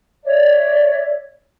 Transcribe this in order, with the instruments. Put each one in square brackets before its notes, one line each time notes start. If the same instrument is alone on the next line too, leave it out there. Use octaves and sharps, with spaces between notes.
[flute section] C#5 D5 E5